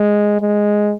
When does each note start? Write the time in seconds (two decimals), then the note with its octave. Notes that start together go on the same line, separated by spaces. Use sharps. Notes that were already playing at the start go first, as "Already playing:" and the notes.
Already playing: G#3
0.41 G#3